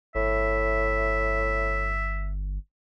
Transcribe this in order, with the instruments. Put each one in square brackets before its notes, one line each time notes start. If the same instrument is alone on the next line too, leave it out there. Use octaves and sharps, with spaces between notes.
[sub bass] G1 [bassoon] A2 [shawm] E5